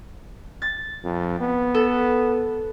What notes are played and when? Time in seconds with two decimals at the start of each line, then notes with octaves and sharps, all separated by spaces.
0.62 A6
1.04 F2
1.41 B3
1.74 A4